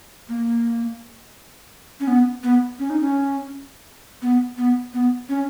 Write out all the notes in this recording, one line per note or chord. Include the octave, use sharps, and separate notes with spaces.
A#3
C#4
B3
B3
C#4
D#4
C#4
B3
B3
B3
C#4